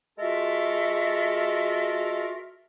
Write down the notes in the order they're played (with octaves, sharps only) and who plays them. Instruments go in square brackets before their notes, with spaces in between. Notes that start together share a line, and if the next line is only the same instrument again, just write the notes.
[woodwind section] G#3 F4 F#4 A4 A#4 E5